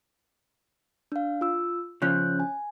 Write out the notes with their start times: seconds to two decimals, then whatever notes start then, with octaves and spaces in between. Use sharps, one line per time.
1.12 D4 F5
1.41 F4 E6
2.02 C#3 F3 C#4 F#6 G6
2.40 G#5